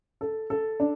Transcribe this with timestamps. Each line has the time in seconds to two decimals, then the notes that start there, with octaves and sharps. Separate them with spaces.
0.21 A4
0.50 A4
0.80 D4